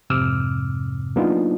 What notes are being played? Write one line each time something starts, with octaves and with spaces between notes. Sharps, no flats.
F2 G#2 C3 D6 E6 F6
F#3 A#3 B3 D4 D#4 F4